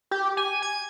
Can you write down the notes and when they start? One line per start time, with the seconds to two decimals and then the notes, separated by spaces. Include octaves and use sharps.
0.11 G4
0.37 G#5
0.63 G#6